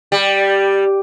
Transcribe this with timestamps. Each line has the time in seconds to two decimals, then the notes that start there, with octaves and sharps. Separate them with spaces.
0.12 G3